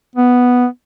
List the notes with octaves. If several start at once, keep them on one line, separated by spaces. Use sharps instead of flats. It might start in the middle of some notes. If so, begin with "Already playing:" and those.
B3